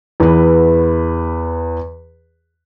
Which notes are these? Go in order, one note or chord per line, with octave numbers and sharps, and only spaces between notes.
E2 B4